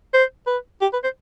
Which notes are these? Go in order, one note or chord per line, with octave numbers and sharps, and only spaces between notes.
C5
B4
G4
B4
C5